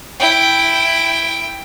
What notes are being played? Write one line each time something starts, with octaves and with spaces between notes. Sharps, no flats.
E4 G5